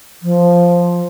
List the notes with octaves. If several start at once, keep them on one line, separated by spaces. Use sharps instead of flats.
F3